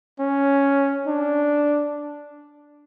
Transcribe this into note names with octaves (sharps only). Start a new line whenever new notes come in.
C#4
D4